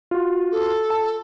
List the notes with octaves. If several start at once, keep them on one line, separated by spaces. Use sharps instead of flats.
F4 F#4
A4
A5